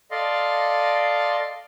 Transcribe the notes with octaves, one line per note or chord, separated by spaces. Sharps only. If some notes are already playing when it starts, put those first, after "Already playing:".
A4 D5 D#5 F5 C6